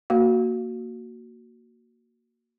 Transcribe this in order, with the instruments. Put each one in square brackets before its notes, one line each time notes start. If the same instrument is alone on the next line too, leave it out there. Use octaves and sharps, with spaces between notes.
[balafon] A#3 F#4 F5